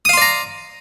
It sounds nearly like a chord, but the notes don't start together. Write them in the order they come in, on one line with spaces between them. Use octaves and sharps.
D#6 F5 C6 D5 A#5